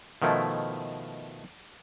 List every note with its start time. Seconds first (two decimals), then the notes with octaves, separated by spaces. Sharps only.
0.22 B2 D#3 F3 A3 E4